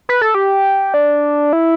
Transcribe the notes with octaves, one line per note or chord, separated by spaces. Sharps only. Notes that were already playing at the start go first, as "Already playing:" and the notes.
B4
A4
G4
D4
E4